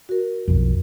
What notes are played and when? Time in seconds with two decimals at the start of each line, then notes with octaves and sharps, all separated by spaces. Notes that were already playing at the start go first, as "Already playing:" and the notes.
0.09 F#4 A#4
0.48 B1 F2